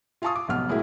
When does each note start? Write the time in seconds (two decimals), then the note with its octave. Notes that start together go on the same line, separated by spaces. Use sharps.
0.22 F4 F5 G#5 A5 C#6 D#6
0.36 D6
0.48 F1 B1 B3 F#5 F6
0.69 A2 G#3 A#3 E4 F#4